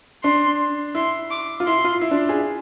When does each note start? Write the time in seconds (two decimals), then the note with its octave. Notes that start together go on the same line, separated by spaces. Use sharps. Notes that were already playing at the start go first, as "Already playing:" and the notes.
0.24 D4 C6
0.95 E4 C6
1.30 D6
1.60 F4
1.67 E4 C6
1.84 F4
2.01 E4
2.11 D4
2.29 G#4